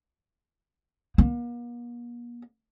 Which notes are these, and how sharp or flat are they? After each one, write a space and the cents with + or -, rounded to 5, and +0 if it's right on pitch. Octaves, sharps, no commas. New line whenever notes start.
A#3 +45